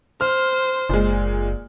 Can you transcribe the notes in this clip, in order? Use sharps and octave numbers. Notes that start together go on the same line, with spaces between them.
C5 F6
F#1 A#2 G#3